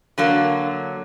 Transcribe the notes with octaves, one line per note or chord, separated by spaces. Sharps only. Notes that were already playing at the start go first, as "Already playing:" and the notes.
D3 F#3 A#3